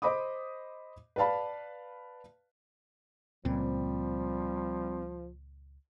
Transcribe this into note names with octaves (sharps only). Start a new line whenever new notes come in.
C5 D#5 B5 D6 D#6
B4 D5 F5 A5 B5
C#2 A#2 F3 G3 C4